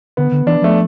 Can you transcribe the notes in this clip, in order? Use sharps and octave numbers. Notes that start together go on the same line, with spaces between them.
D3 B3
D3
E3 D4
F3 A3